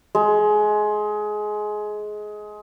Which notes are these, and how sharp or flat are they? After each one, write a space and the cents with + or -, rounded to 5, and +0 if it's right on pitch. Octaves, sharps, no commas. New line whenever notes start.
G#3 +20